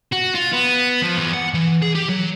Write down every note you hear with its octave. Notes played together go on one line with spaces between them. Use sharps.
F#4
F4
B3
F3
E2
F#5
E3
G#4
G4
F#3